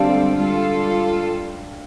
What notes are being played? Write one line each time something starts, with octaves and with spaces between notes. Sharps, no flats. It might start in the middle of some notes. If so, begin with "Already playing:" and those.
Already playing: D3 G3 C4 D4 G4 A4 F5 A5
G3 F4 A4